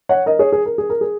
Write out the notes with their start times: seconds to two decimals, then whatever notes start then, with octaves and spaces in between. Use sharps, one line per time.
0.09 C#5 F#5
0.26 A#4 D#5
0.39 G#4 C#5
0.52 G#4
0.66 A#4
0.78 G#4
0.90 A#4
1.01 G#4